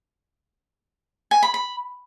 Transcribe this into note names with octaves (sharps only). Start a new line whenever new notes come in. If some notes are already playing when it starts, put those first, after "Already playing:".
G#5
B5
B5